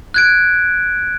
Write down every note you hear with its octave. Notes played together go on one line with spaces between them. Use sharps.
F#6 G#6 D7